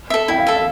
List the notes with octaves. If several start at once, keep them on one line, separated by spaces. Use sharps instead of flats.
A4 E5
E4 G5
F5
A4 E5
F5